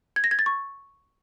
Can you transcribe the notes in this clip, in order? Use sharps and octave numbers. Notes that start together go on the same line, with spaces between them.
G#6
A#6
G#6
A6
C#6